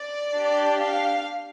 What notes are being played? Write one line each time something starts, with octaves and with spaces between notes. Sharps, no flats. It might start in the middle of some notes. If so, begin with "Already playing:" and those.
Already playing: D5
D4 G4
F5